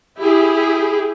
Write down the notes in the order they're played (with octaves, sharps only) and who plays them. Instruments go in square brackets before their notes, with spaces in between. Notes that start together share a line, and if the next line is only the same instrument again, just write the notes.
[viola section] E4 G4 G#4